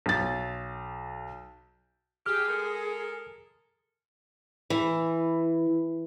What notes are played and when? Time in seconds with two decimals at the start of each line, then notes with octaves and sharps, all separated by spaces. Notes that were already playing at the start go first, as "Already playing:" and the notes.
0.06 B1 A6
2.26 G4 G#4 F6
2.48 G#3 A4 A#4
4.70 E3